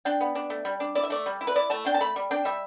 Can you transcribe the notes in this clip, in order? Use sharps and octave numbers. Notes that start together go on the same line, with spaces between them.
D4 G5
B3
D4
A3
G3
D4
E4 D5
E5
A3 D5
G3
E4
B4
E4 D5
A3 A5
D4 G5
A5
A3 B5
G3
D4 G5
G3 E5